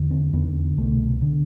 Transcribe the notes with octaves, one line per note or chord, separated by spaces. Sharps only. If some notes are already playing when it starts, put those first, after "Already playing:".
Already playing: E2 D3
C4
E2 D3 B3
C2 B2 A3
D3